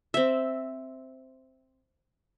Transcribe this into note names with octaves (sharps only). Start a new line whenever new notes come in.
C4 E5